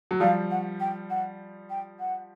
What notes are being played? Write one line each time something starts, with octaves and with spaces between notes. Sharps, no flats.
F#3
F3 G3 F5
F#5
G5
F#5
G5
F#5